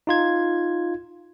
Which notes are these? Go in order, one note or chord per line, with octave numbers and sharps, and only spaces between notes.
D#4 F4 G#6